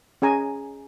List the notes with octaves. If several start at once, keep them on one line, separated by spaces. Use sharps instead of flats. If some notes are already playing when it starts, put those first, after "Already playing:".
C#4 G#4 G#5 A#5